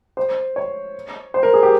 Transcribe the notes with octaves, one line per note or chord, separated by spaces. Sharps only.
C5
C#5
C5
A#4
G#4
G4